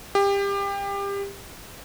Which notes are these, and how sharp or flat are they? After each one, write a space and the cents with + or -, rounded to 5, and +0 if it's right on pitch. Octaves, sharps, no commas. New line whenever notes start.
G4 +25